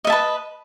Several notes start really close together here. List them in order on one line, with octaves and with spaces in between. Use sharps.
D#5 E5 A5 B4